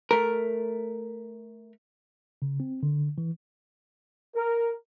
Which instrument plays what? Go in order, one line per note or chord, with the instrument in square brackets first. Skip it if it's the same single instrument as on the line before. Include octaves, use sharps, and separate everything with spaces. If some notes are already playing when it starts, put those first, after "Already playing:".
[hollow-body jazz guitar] A3 A#4
[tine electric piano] C#3
C4
D3
E3
[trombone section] A#4